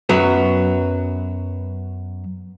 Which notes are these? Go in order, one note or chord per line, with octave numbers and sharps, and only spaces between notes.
F#2 F#3 B3